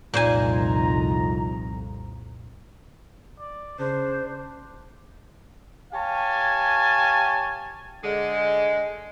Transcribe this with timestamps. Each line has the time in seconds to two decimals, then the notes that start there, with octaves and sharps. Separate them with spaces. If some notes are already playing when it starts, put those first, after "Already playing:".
0.14 C2 F2 A#2 D#4 F4 C5 G#5 A#5
3.39 D5
3.79 C#3 D4 C5
5.93 G4 C#5 F5 G#5 A5
8.04 D3 G#3